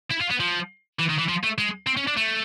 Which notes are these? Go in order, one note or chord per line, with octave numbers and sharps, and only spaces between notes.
E4
F4
B3
F3
E3
D#3
E3
F3
A3
G#3
C4
C#4
D4
A3